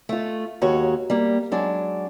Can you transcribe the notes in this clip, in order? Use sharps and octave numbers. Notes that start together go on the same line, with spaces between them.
A3 F4
D#2 G#2 F#4 C#5
G3 A#3
F#3 G#3 D4